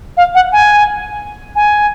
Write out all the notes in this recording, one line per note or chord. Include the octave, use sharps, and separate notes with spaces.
F5
F#5
G#5
G#5